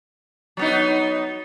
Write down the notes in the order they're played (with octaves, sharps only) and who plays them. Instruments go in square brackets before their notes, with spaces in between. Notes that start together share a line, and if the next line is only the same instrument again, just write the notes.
[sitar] F#3 B3 D#4